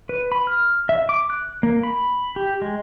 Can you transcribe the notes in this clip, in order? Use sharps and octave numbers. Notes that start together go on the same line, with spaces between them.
B4
B5
F6
E5
D6
F#6
A#3
B5
G4
G#3